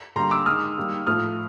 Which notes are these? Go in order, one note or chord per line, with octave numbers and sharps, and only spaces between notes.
D3 G3 A#3 A#5 C6
D6 E6
D#3 G#3 D#6 F6
D#3 G3 A#3
A2 F3 A3 D#6 F6